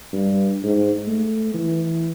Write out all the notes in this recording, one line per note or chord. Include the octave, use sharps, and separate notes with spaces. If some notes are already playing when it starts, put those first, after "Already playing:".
G2
G#2
A3
E3